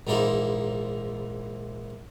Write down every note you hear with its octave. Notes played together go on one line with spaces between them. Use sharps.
A#1 G#2 E3 A#3 D#4 C5